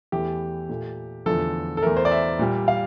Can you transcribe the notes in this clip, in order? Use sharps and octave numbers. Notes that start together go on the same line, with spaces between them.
E2 E3 A3 G4
A#2 A3
E2 D3 F3 A3 A4
A4
E2 E3 A3 A#4
C5
D5
E5
A#2 G3
F5